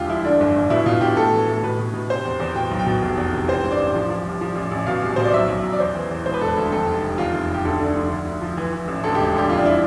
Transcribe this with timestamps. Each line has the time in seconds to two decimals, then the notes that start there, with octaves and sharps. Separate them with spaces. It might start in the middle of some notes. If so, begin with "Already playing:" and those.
Already playing: E1 D2 F4 G4
0.09 F3 E4
0.24 D3 D4
0.40 G1
0.56 G1
0.70 B2 E4
0.86 B2 F4
1.01 B2 G4
1.17 A2 A4
1.32 E3
1.48 A2
1.53 A4
1.64 B2 B4
1.79 B2
1.94 B2
2.10 C3 C5
2.25 E2
2.40 E2
2.55 B2 G5
2.71 B1
2.79 G5
2.86 B2
3.02 F1
3.17 E2
3.33 C3
3.48 E3 C5
3.64 G2
3.71 D5
3.79 A1
3.95 F3
4.10 F3
4.26 C2
4.41 F3
4.56 A1
4.71 A1
4.87 B2 F5
5.03 C2
5.16 B2 C5
5.25 D5
5.34 B1 E5
5.48 B1
5.64 B1
5.73 D5
5.79 E2 C5
5.95 E3
6.11 E2
6.26 E1 C5
6.34 B4
6.41 E1 A4
6.48 B4
6.57 D2
6.72 F2 A4
6.87 F1
7.03 C3
7.18 E2 F4
7.33 F1
7.49 F1 G4
7.65 D2 A4
7.80 D3
7.96 F3
8.10 D3
8.26 D2
8.42 F3
8.57 E3
8.73 E3
8.88 A1
9.04 D2 A4
9.15 G4
9.18 E1
9.34 D3 G4
9.49 F2 F4
9.57 D4
9.66 E4